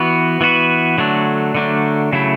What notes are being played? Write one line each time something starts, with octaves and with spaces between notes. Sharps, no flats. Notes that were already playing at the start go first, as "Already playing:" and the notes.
Already playing: E3 B3 F#4 B4
E3 B3 F#4 B4
D3 F#3 A3 D4
D3 F#3 A3 D4
C#3 F#3 A3 E4